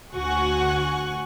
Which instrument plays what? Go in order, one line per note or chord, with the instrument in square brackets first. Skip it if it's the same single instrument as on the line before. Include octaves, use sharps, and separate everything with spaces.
[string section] D2 F#4 F#5 G#5 C#6 F#6